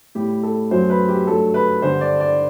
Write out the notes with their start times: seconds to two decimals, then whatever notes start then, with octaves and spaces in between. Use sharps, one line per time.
0.15 A2 G3 G4
0.43 A4
0.71 F#2 F#3 A3 C5
0.90 B4
1.08 G4
1.27 G2 F#3 A3 A4
1.54 B4
1.82 G2 D3 G3 C5
2.01 D5
2.20 D5